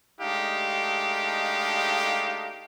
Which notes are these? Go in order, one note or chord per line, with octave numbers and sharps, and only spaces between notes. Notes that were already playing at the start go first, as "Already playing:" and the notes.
G#3 A3 D4 D#4 G4 F5